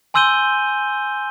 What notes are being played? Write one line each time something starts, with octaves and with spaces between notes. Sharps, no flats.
G#5 C6 E6 G6 D#7 G7